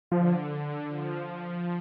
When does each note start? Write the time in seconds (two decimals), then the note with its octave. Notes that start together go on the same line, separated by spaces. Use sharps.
0.11 D3 F3
0.88 F3